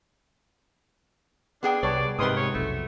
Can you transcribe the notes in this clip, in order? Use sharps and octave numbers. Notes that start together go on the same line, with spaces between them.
B3 D4 G#4 G5
C2 B4 C#5 D5 A5
G#2 C3 D#3 B4 C6 D#6
C#5
F1 B1 A3